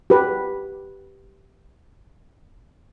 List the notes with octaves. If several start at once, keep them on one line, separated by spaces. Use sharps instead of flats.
G4 B4